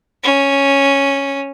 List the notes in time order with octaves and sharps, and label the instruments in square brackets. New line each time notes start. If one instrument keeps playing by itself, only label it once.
[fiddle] C#4